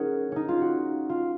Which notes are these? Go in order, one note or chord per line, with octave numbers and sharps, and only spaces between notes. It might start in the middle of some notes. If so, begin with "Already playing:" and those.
Already playing: C#4 D#4 F#4 G#4 A#4
C#4 D#4
F4
F#4
F4